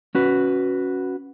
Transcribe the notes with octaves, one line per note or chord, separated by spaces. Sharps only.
C#4 F#4 B4